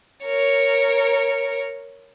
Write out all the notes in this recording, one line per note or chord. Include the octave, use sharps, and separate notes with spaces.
A#4 C#5